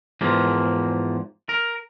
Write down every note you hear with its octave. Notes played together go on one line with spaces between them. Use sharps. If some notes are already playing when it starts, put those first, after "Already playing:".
E2 G#2 F3 A#3
A#4